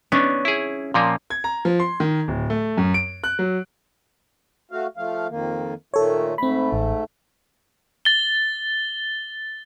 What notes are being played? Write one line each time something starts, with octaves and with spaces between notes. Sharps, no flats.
B3 C#4 D4
E4 G#4
A#2 F3 A#3
G#6
A#5
F3
C6
D#3
D1
A3
F#2
D7
F#6
F#3
A3 F#4 F5
F3 A3 F5
F2 D#3 A#3
A#2 D#3 A3 A4 C#5
G#2 A3 C4 B5
A1
A6 G7